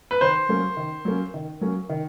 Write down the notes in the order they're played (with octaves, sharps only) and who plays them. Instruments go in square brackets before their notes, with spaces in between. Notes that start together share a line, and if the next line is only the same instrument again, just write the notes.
[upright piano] B4
[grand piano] D#3 [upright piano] C5
[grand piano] F#3 A#3 C#4
D#3
F#3 A#3 C#4
D#3
F#3 A#3 C#4
D#3